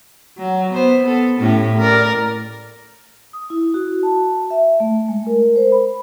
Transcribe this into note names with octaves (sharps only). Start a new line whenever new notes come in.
F#3
B3 C5
B3 A4
A2 C#4 G4
A#4 D5
D#6
E4
F#4
A5
E5
A3
G#3
A#4
C5
B5